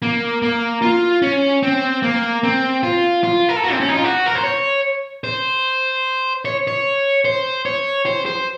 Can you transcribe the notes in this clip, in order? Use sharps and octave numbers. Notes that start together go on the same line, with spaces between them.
A#3
A#3
F4
C#4
C4
A#3
C4
F4
F4
A#4
A4
F#4
C4
C#4
D#4
F4
F#4
A#4
C5
C#5
C5
C#5
C#5
C5
C#5
C5
C5